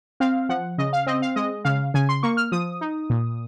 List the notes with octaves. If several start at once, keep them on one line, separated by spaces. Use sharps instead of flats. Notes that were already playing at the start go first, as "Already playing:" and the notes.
C4 F5
F3 F#5
C#3 D#5
F5
C4 D#5
F5
G#3 D#5
C#3 F5
C#3 G#5
C6
A#3 C#6
F6
F3 D#6
D#4
A#2